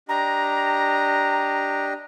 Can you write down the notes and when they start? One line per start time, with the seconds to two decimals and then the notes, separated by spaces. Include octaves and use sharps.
0.09 D4 G4 D#5 A#5